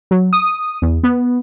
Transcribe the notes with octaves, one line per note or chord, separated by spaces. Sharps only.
F#3
D#6
E2
B3